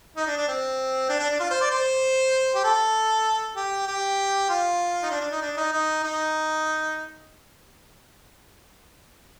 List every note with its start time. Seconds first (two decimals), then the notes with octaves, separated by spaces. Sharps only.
0.16 D#4
0.27 D4
0.37 D4
0.48 C4
1.09 D4
1.19 D4
1.30 D4
1.40 F4
1.50 C5
1.61 D5
1.71 C5
2.55 G4
2.64 A4
3.56 G4
3.87 G4
4.49 F4
5.03 D#4
5.11 D4
5.21 D4
5.32 D#4
5.42 D4
5.57 D#4
5.73 D#4
6.04 D#4